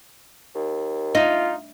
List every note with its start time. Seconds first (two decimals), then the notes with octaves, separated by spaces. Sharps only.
0.55 D#2
1.15 D#4 F4